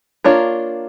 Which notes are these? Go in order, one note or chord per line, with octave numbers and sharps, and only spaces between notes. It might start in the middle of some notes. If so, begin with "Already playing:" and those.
A#3 D4 F4 A#4 C#5